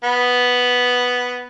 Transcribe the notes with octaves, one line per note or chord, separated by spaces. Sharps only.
B3